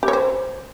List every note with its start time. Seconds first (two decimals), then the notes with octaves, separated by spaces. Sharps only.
0.03 G4
0.08 C#5
0.13 C5